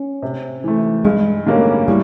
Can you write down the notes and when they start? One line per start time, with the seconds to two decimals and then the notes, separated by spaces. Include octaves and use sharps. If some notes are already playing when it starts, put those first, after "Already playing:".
Already playing: C#4
0.22 C3
0.64 E3 A3
1.05 G2 G#3
1.46 D3 G3 A#3 C#4
1.88 A2 G3